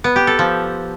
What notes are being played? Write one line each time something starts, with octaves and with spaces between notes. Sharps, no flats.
B3
G4
A4
F3